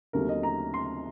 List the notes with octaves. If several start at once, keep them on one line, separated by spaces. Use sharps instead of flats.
D#2 D3 F#3 A3 C4 A#4
D#5
A#5
C6